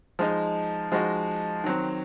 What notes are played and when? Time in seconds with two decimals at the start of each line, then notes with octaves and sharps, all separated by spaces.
0.19 F3 G#3 D#4
0.92 F3 G#3 D#4 F#4
1.64 D#3 F#3 C4